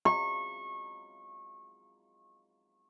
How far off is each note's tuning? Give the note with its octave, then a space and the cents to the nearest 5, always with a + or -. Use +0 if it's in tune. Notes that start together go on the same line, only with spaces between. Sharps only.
C#6 -25